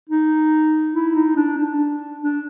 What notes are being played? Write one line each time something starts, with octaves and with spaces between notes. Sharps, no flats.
D#4
E4
D#4
D4
D4
D4